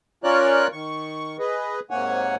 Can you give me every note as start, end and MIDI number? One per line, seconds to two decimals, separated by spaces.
0.24 0.67 61
0.24 0.67 65
0.24 0.67 70
0.24 0.67 73
0.24 0.67 74
0.24 0.67 90
0.72 1.37 51
0.72 1.37 85
1.39 1.80 68
1.39 1.80 71
1.39 1.80 75
1.90 2.36 44
1.90 2.36 48
1.90 2.36 58
1.90 2.36 73
1.90 2.36 78
1.90 2.36 80